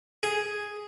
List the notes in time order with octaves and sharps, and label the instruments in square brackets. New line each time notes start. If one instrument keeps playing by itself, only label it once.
[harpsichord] G#4